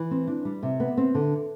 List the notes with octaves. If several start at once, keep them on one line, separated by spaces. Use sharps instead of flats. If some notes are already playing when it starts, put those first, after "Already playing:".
Already playing: E3
C4
D4
G3
C3
B3
C4
D3